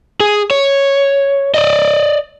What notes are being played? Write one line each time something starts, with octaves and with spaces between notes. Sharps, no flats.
G#4
C#5
D5 D#5